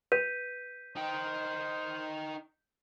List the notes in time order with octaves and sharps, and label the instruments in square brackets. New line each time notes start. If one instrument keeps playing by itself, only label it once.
[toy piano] B4 [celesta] G6 B6 D#7
[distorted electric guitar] D#4 G5 [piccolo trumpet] C5